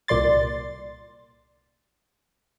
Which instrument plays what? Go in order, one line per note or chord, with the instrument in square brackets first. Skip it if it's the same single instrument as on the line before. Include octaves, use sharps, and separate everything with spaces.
[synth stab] C2 A#2 D5 C6 A6